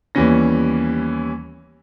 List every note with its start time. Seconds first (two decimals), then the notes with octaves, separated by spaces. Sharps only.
0.15 D#2 E3 G3 B3 C#4 A#6